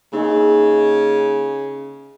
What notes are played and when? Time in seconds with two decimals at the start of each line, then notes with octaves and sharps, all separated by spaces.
0.13 C#3 A#3 D#4 G#4 D#5 G#5